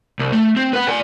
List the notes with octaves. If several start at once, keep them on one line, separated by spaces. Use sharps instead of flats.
C2
A3
C4
B4 F#5
D5 G#5